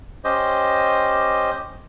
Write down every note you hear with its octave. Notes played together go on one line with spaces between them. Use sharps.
C#4 G4 C5 D#5